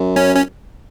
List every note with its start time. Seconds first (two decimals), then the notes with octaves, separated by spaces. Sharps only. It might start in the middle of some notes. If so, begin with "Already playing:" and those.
Already playing: F#2
0.16 C#4
0.36 C#4